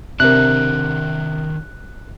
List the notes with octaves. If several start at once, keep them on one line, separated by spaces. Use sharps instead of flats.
C3 D#3 D4 A#4 F#6